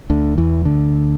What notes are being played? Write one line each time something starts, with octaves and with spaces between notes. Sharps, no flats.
D2 D3
E2 E3
D2 D3